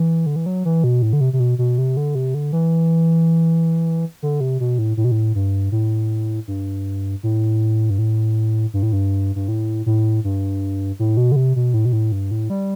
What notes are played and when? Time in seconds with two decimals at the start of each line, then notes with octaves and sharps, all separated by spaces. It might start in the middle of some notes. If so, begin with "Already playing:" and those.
Already playing: E3
0.26 D3
0.36 E3
0.46 F#3
0.65 E3
0.84 B2
1.02 A2
1.13 D3
1.21 C3
1.33 C3
1.40 B2
1.58 B2
1.78 C3
1.97 D3
2.15 C3
2.34 D3
2.53 E3
4.23 D3
4.40 C3
4.60 B2
4.78 A2
4.97 A2
5.04 B2
5.11 A2
5.35 G2
5.72 A2
6.48 G2
7.23 A2
7.90 G2
7.99 A2
8.74 G2
8.83 A2
8.93 G2
9.36 G2
9.48 A2
9.86 A2
10.24 G2
10.99 A2
11.17 B2
11.32 D3
11.36 C3
11.56 B2
11.74 A2
11.85 B2
11.93 A2
12.12 G2
12.31 A2
12.50 G3